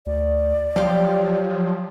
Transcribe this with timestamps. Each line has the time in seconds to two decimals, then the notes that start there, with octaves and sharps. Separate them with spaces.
0.06 D2 D5
0.76 F3 F#3 G4 F5 G5